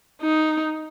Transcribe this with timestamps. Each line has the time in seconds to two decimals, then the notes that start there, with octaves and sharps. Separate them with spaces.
0.21 D#4